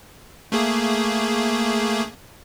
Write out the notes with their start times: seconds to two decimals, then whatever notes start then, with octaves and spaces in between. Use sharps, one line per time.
0.52 A3 A#3 G#4